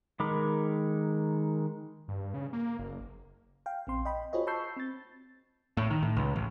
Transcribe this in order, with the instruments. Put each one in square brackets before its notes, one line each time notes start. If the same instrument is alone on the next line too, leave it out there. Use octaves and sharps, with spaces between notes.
[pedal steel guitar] D#3 G#3 A#4 B5 D6
[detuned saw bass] G2
C#3
A#3
F#1
[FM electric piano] F5 G5
A#1 C4 C6
D#5 G5 B5
F4 F#4 G#4 C5 C#5 D#5
A5 B5 C#6 E6 G6 C7
C4 A6
[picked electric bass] A2
D#3
A2
C#2
A1